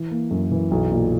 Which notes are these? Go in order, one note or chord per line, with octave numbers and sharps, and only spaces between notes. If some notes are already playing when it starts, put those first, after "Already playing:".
Already playing: E3
A#3
F#2
E3
B1
A#2